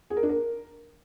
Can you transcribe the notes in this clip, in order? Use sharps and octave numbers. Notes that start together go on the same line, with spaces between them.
G#4
A#4
D4
A#4